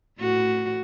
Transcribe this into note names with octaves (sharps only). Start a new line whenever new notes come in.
A2 F#4